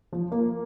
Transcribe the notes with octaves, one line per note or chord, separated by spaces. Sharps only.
F3
A#3